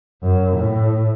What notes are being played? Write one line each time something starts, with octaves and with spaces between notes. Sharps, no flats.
F#2
A2